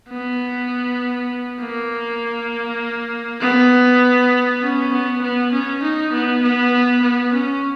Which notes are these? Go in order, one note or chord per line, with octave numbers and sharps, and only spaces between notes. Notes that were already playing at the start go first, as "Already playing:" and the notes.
B3
A#3
B3
C#4
B3
B3
C#4
D#4
B3
B3
B3
C#4